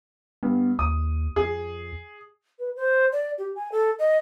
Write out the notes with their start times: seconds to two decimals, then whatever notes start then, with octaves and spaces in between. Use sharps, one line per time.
0.43 G2 B3
0.79 D#2 D#6
1.36 F2 G#4
2.59 B4
2.76 C5
3.13 D5
3.38 G4
3.55 G#5
3.72 A4
3.99 D#5